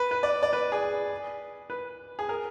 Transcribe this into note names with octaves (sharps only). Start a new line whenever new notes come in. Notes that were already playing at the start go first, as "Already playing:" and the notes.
Already playing: B4
B4
D5
D5
B4
G#4
B4
G#4
A#4